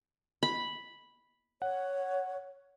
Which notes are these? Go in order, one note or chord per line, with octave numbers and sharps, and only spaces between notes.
B5
C#5 F#5